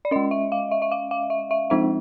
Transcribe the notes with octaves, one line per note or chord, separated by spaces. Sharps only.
D5
G#3 C#4 D#5
E5
F5
E5
E5
F5
F5
E5
E5
F3 G#3 C4 D#4 E5